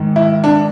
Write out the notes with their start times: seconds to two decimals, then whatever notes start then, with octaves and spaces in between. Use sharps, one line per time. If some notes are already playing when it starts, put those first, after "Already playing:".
Already playing: G#2 D#3
0.16 E4
0.44 D4